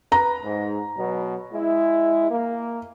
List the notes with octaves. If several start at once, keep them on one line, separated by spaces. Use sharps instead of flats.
B4 A#5
G#2
B2 F#3
G#3 E4
A#3